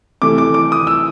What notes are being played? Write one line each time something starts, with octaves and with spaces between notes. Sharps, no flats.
C3 E3 A3 D6
D6
D6
D#6
E6